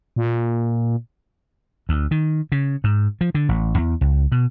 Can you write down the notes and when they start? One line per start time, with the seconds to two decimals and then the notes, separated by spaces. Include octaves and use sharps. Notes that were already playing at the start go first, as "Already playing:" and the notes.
0.16 A#2
1.89 D2
2.11 D#3
2.52 C#3
2.84 G#2
3.21 F3
3.35 D3
3.49 A1
3.78 E2
4.01 C#2
4.32 B2